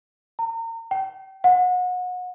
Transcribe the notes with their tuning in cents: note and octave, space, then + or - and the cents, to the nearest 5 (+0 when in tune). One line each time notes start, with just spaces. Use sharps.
A#5 -35
G5 -30
F#5 -30